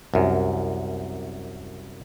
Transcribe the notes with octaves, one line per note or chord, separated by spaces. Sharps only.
C2 F#2